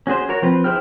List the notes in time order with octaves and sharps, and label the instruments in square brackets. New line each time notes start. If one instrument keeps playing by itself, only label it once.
[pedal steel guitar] C#4 F#4 G#4 C5
F#4 A#4 C#5
F3 C4 B4
E4 G#4 C5 G5 F6